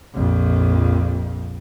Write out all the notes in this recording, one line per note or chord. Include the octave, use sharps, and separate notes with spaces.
A#1 F2